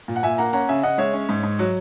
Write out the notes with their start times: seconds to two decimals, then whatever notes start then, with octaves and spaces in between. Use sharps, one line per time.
0.08 A#2
0.16 F#5
0.23 A#2 E5 G#5
0.38 A#3 F#5 A#5
0.53 C#4 F#5 A#5
0.69 C#3 E5 G#5
0.83 C#3 D#5 F#5
0.98 G#3 C#5 E5
1.13 C#4
1.29 G#2
1.43 G#2
1.59 F#3